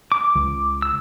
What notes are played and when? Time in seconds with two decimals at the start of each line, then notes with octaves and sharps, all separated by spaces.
0.12 D6
0.35 C#2
0.82 E6